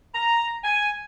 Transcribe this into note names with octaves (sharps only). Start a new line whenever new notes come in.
A#5
G#5